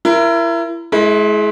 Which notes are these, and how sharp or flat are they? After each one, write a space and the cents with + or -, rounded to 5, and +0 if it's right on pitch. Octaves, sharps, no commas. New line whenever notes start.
E4 +30 A#4 +0
G#3 +30 E4 -10